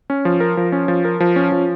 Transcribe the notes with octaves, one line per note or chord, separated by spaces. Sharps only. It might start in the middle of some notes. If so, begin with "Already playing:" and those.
C#4
F3
A#4
F3
C#4
F3
A#4
F3
C#4
F3